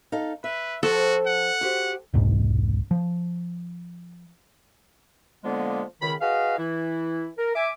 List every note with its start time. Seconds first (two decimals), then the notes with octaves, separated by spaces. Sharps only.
0.12 D#4 A4 F5
0.44 B4 E5
0.83 F3 F#4 A4 C5 G5
1.26 F#5
1.61 F#4 G4 C5
2.14 E1 C2 G#2
2.91 F3
5.44 D3 F3 G#3 A#3 B3
6.01 C#2 D#3 B5
6.21 F#4 G#4 B4 D#5 F5
6.58 E3 E4
7.38 A#4
7.55 E5 G#5 D6